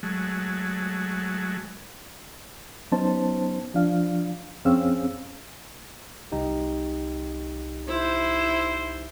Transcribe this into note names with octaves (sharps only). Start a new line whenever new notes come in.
F#3 G#3 A3
F#3 B3 C#4 D#4 C5 A5
F3 D4 F5
F2 C4 C#4 G#4 F5 E6
C2 D#4 G4
E4 C5